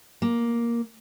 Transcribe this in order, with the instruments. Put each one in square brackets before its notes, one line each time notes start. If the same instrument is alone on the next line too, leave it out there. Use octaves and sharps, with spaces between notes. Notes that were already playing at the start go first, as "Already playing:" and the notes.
[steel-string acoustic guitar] A#3